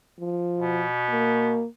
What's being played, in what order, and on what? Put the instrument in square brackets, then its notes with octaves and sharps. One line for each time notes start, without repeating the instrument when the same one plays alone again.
[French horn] F3
[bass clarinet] B2
[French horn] A#3